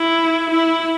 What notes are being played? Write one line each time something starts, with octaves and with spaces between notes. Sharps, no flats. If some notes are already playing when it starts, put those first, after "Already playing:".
Already playing: E4
E4